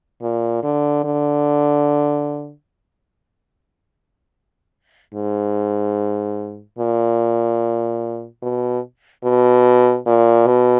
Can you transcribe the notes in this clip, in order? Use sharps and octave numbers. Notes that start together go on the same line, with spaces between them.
A#2
D3
D3
G#2
A#2
B2
B2
A#2
B2